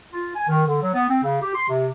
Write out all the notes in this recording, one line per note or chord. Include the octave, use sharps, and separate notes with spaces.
F4
G#5
D#3
D3
F#3
B3
C4
C#3
G4
C6
C3